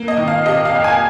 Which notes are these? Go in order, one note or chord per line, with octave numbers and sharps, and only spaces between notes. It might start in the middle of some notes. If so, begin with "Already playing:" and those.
Already playing: A#3
D#5
D#3
F5
C3 D#5
F5
F2
G#5